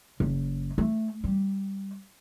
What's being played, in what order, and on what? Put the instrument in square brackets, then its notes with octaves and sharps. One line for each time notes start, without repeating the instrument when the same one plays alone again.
[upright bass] F#1
A3
G3